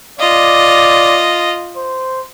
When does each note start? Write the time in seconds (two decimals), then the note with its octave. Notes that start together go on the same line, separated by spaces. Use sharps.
0.19 F4 D5 D#5
1.76 C5